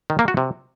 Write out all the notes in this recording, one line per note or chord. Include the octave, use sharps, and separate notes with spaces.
D#3
A#3
F#4
C3